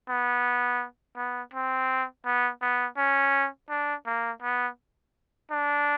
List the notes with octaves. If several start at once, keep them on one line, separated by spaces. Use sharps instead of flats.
B3
B3
C4
B3
B3
C#4
D4
A#3
B3
D4